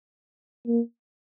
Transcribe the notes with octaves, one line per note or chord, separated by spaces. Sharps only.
A#3